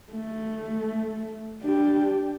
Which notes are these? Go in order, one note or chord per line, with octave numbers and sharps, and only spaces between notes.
A3
D4 G4